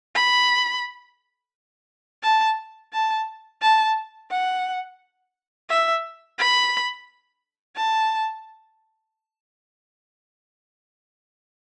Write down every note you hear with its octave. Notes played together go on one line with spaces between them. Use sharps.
B5
A5
A5
A5
F#5
E5
B5
A5